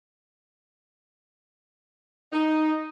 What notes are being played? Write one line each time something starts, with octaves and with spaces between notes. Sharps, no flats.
D#4